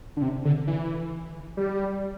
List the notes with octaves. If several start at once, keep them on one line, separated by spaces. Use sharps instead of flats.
D3
C3
D3
E3
G3